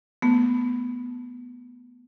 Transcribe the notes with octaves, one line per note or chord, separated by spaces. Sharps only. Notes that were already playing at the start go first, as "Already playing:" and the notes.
A3 B3